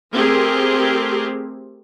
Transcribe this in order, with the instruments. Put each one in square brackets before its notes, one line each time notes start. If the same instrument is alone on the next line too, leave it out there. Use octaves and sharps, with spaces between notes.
[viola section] A3 C4 G4 G#4 A#4